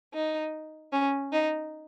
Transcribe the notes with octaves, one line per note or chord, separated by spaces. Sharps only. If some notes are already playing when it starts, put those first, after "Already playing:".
D#4
C#4
D#4